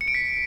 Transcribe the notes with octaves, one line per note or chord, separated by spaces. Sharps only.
C#7
D7
B6